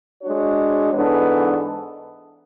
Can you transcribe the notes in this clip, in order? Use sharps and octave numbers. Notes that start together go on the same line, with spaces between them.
G#3 D4 F#4 C#5
G#2 E3 B3 D4 A4